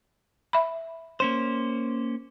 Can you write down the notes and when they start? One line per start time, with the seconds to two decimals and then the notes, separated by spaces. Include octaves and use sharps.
0.53 E5 B5
1.20 A#3 C#4 C5